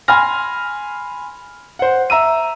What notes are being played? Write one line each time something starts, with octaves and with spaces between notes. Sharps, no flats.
G#5 B5 C6 F6 A#6
C5 F#5
E5 A#5 E6 D#7